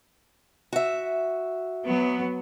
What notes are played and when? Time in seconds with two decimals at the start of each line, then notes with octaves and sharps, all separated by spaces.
0.73 F#4 E5
1.84 F#3 B3